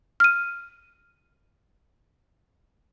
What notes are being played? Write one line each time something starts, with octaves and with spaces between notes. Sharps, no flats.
F6 D#7